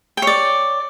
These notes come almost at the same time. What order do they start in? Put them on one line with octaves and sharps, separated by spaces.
G5 C#5 D5